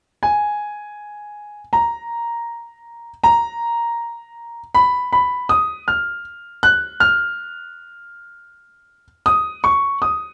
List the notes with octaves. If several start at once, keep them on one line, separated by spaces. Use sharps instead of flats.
G#5
A#5
A#5
B5
B5
D#6
F6
F#6
F6
D#6
C#6
D#6